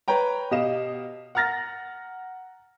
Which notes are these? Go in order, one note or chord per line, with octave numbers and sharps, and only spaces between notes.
B4 C#5 G5 A#5
B2 G4 D#5 F5 E7
F#5 A#5 F6 A6 A#6